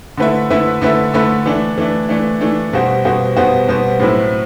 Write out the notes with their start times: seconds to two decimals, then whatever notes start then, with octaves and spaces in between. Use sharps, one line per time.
0.17 D3 A3 E4 B4 E5
0.50 D3 A3 E4 B4 E5
0.82 D3 A3 E4 B4 E5
1.14 D3 A3 E4 B4 E5
1.46 E3 A3 D4
1.78 E3 A3 D4
2.09 E3 A3 D4
2.41 E3 A3 D4
2.73 B2 G3 B3 F#4 C5
3.05 B2 G3 B3 F#4 C5
3.36 B2 G3 B3 F#4 C5
3.68 B2 G3 B3 F#4 C5
4.00 A2 F#3 C4 E4 B4